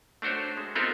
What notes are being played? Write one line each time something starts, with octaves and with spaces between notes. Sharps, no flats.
A3 D4 F#4 C5 C#5
G#3
B3 C4 D#4 F4 A4 A#4